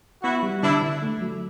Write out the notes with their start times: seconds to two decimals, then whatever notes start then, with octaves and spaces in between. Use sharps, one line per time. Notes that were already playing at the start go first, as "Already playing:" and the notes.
0.23 B3 E4 F#4
0.43 G3
0.62 D3 D4 E4
0.82 D3
1.02 A3
1.21 F#3